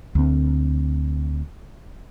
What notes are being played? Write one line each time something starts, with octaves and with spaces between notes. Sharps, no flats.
D2 C4